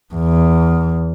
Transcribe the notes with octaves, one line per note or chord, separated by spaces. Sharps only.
E2